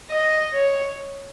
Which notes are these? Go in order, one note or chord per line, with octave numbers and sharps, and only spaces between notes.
D#5
C#5